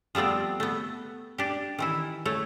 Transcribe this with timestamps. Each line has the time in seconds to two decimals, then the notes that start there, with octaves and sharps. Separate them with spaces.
0.15 F3 G3 A3 B3 C4
0.60 A3 B3
1.38 D4 G4
1.78 D#3 E3 E4
2.25 A3 C#5